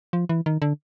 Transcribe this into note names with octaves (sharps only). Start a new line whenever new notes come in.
F3
E3
D#3
D3